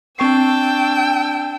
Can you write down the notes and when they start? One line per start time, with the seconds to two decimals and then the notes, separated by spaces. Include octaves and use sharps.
0.19 C4 D4 G5 C#6 E6 C7